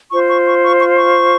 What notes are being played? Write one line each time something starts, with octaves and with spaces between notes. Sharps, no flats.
F4 C5 C#6
C#6
C#6
C#6
C#6
C#6